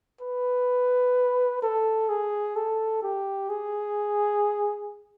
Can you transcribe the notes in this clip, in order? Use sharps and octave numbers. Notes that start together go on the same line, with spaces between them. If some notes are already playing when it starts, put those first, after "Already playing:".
B4
A4
G#4
A4
G4
G#4